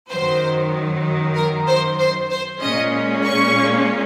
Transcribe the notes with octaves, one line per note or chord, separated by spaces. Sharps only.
F#2 D#3 F#3 C5
A#4
C5
C5
C5
A#2 G#3 C#4 D#5
C#6